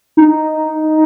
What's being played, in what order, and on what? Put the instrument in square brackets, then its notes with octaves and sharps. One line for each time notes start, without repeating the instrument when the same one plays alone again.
[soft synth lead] D#4